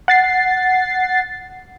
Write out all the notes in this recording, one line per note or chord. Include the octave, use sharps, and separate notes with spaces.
F#5 A6 C7